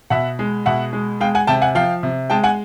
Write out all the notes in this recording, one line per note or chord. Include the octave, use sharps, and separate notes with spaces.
B2 E5 F#5
G#3
B2 E5 F#5
G#3
G#3 F5 G5
F#5 G#5
C3 G5 A5
F#5 G#5
F3 F5 G5
C3
G#3 G5 A5
F#5 G#5